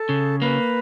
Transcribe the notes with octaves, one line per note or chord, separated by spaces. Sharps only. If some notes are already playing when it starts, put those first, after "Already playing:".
Already playing: A4
C#3
A#3 B4